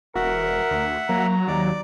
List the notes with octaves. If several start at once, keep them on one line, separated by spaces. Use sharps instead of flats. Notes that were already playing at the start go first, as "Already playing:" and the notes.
E1 F#4 A#4 E5 F#5
D2
F#3 A#3 A#5
D#2 D5